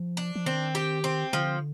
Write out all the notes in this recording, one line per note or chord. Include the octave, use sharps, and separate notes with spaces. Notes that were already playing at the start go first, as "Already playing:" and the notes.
Already playing: F3
D4
F3
D#3 C4
G4
C4
D3 F3